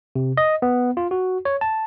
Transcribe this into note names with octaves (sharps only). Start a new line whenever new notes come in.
C3
D#5
B3
F4
F#4
C#5
A5